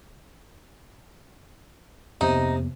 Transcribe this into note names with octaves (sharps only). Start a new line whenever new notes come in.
F2 C3 A#3 B3 D#4